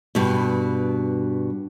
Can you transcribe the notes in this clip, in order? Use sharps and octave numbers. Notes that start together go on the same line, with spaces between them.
G2 B2